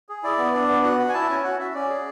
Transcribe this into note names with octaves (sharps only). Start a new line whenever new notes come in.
G#4
E4 D5
B3
D4
B3
F#4 F#5
F#4
G#5
E4 A5
C#4 G#5
F#4 F#5
F#4 E5
C#4 D5
G#4